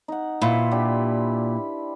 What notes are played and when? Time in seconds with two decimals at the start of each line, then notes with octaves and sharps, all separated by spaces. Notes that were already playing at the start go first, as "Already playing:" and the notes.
0.08 D#4 F#5
0.41 A#2 E4 B4 C5
0.71 D4 G4